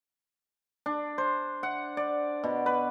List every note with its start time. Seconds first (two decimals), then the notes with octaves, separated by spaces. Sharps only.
0.86 D4
1.18 C5
1.63 F#5
1.97 D5
2.44 B2
2.66 B4